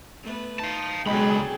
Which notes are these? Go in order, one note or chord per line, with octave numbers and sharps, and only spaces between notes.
A3 B3 B4
D#4 F5 A5
C#2 B2 D3 F#3 G#3 G#4 G5 B5